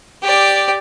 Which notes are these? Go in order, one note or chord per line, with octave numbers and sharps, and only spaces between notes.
G4 D5